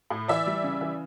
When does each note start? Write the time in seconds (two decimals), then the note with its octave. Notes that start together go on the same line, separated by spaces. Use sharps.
0.10 A2
0.28 E3 D5 E5
0.46 G3
0.64 C#3
0.81 E3